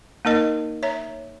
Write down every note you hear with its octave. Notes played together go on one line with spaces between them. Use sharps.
A#3 D#4 A#4 D#5
C#5 E5 A#5